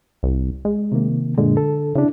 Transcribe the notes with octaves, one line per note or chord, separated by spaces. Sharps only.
C2
G#3
C3 D#3 A#3
F#2 A#2 D3 G#3
A4
C#3 D4 E4